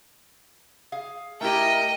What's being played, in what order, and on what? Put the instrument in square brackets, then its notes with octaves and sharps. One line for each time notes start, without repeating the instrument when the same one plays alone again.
[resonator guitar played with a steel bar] G#4 F5
[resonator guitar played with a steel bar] A3 E4 G4 [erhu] A#4 [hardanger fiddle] D#5 G5